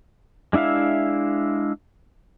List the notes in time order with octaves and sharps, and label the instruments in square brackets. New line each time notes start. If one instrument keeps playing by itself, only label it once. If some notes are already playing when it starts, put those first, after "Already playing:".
[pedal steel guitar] G#3 D4 E4 E5 F5